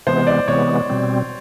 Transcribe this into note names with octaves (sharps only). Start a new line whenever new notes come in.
C3 E3 G#3 B3 C5
D5
C3 E3 G#3 B3 C#5
B2 G3 C4